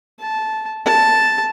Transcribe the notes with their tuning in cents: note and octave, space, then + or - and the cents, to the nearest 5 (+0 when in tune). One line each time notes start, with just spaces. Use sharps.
A5 -10
A5 +0